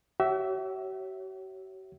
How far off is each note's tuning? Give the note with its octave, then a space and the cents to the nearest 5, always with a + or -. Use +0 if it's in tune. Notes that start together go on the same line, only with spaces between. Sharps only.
F#4 +45 C#5 +0 E5 +0